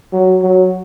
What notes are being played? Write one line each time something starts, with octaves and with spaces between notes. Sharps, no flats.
F#3
F#3